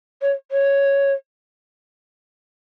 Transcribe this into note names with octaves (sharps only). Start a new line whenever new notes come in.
C#5
C#5